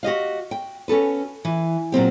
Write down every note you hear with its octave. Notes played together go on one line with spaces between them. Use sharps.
F#4 G4 D#5 F5
G5
C#4 F#4 A4 B4
E3
A#2 F#3 C4 G4